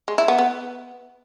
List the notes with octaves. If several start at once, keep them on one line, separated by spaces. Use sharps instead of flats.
G#3
E4
B3
B3